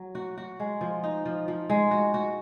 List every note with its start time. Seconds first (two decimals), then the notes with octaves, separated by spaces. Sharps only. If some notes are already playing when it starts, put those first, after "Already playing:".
Already playing: F#3
0.15 F#4
0.38 F#4
0.60 G#3
0.81 F3
1.04 D#4
1.26 F3
1.48 F3
1.70 G#3
1.91 F#4
2.14 F#4